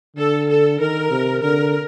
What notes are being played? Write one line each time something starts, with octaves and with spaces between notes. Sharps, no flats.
D3 A4
A4
D#3 A#4
C3
D3 A#4